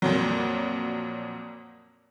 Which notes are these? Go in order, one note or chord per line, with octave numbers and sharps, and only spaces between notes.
F2 A#2 F#3